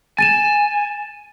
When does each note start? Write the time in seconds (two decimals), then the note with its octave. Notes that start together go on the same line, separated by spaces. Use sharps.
0.18 G#5 A6 D#7 E7